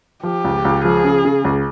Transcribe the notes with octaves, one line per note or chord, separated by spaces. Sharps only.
F3 G4
C#2
C#2
F3 G#4
C#3
C#3
C#2